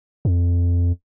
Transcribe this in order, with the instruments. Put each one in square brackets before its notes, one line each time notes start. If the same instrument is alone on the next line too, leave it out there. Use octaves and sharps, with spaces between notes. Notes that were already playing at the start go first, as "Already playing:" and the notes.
[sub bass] F2